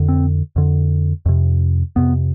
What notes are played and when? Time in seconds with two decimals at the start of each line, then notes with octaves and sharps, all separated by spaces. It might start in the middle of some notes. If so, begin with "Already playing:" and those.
Already playing: F2 D3
0.09 C4
0.56 F2 D3
1.26 F2 C3
1.96 F2 C3 B3